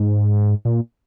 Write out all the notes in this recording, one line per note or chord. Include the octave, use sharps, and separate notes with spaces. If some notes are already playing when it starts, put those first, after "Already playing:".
Already playing: G#2
A#2